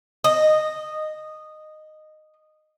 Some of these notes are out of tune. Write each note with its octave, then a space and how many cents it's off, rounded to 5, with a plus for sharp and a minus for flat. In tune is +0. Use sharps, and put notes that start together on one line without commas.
D#5 -10